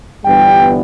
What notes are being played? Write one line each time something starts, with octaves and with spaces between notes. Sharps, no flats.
G1 G2 E3 G3 B3 G5